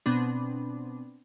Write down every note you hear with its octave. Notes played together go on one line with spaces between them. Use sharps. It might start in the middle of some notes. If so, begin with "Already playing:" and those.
B2 B3 C4 D4